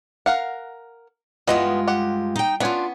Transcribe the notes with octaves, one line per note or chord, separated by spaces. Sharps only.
A#4 F5 F#5
G2 E3 G#3 B3 F4 D#5
G4 F#5
D#4 G5
B3 C#4 D4 F4 G#5